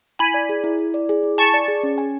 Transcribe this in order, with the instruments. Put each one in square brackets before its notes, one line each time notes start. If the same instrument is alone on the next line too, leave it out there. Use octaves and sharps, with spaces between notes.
[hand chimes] E4 [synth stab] G#5 B5
[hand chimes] D5
G#4
E4
E4
D5
G#4
E4
[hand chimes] G#5 [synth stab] A5 C#6
[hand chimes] D5
G#4
C#4
G#5